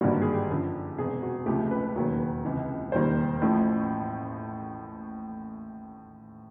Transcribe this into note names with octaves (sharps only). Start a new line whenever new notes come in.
G#1 G2 D3 G3 A#3 F#4
G#4
G4
F#2 D3 F3
E1 E2 C3 G#4
F#4
C#2 C3 F3 A3 G4
B4
B4
E1 D#2 D#3 F#3 A#3
C#2 C3 E3
E1 D#2 D#3 G3 A#3 C5
A1 A2 F3 A3